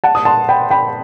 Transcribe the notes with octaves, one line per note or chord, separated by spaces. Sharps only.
F#5 A5
D#6
A5 C6
G5 B5
G5 B5